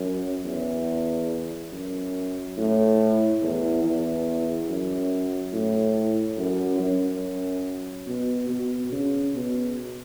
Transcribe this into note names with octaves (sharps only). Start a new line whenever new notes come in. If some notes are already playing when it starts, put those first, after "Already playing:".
Already playing: F#2
E2
F#2
A2
E2
E2
F#2
A2
F#2
F#2
B2
B2
C#3
B2